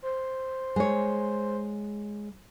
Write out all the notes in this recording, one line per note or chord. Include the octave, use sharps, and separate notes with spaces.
C5
G#3 C#5